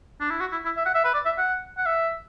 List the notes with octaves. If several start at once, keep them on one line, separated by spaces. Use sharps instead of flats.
D4
E4
F#4
E4
E4
E5
F#5
E5
B4
D5
E5
F#5
F#5
E5